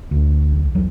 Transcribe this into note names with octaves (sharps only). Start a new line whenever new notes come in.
D2
B1
E2 F#3